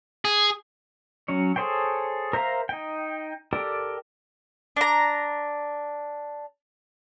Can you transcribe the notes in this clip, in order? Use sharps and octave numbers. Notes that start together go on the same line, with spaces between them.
G#4
F#3 C#4 C#5
G#4 A4 C5 C#5 G5
A#4 C5 E5 F5 A#5
D#4 G5
G4 A4 A#4 D5 G5
D4 A#5